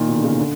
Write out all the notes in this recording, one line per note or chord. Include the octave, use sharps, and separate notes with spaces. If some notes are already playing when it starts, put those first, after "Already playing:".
Already playing: A#2 D#3
B2
D3
C#3
D3